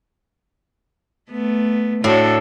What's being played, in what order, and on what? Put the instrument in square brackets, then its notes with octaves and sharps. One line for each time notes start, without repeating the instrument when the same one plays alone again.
[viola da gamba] A3 B3
[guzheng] A2 [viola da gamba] D4 F#4 A4